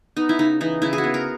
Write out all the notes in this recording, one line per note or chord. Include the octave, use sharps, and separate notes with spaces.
B3 D#4
E4
C#3 D#4
E3 D#4
C#3 E4
G#4
F#4
B3
A#4